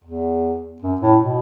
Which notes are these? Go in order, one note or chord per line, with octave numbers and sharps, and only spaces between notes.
E2
F#2
A2
B2